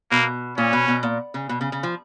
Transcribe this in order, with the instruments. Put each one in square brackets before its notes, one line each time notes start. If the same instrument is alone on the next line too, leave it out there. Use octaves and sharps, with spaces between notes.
[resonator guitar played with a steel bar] B2 [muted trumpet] A#3
[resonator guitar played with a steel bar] A#2 [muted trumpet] C#4
[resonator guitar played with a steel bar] B2
B2
A#2
C#3
B2
C#3
C#3
F3